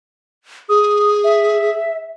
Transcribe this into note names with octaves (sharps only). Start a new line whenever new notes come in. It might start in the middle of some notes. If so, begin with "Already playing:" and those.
G#4 D#6
E5